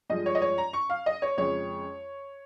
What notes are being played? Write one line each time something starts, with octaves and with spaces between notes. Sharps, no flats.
G2 F3 G#3 D#5
C#5
D#5
C#5
A#5
C#6
F5
D#5
C#5
F2 C#3 G#3 C#5